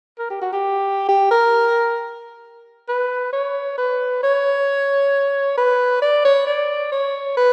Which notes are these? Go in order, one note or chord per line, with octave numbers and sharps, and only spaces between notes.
A#4
G4
F#4
G4
G4
A#4
B4
C#5
B4
C#5
B4
D5
C#5
D5
C#5
B4